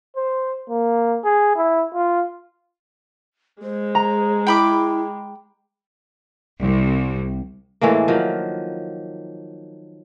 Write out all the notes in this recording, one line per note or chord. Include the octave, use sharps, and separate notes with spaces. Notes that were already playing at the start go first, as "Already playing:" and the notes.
C5
A#3
G#4
E4
F4
G#3 C5
A#5
E4 G5 B5 D6
C2
A2 E3 G#3 A#3
D#3 F3 F#3